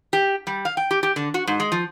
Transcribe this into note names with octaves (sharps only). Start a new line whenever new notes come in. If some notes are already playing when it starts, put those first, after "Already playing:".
G4
G3
F5
G5
G4
G4
D3
F#4
G#2
G#3
F3